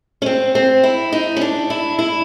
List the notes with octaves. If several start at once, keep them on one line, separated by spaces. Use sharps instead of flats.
C#4
C4
C4
E4
D#4
C#4
D4
E4
E4